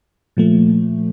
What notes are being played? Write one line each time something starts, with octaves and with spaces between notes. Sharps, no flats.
A#2 F3 A3